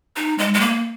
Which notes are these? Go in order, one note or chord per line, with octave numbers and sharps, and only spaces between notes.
D#4
G#3
G#3
A#3